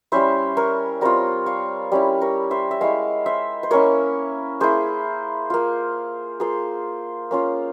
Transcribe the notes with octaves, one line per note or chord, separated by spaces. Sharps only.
G3 C#4 E4 C5 E5
A#4 C#5
G3 C4 F4 A#4 C#5
C#5 F5
G3 C#4 E4
A#4 C#5
C5 E5
E5
G#3 E4 C#5 F5
C5 E5
C5
A#3 C#4 E4 A#4 C#5
A#3 E4 G#4 C5
A#3 F4
A#3 F4 G#4 C5
A#3 C#4 F4